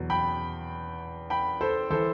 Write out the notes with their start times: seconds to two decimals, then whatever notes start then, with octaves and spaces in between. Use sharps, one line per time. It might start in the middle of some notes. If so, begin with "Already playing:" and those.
Already playing: E2 B2 F#3
0.10 G5 B5
1.30 G5 B5
1.61 A4 C5
1.90 E3 A4 C5